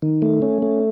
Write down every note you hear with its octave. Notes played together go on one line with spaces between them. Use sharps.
D#3
A3
C#4
A3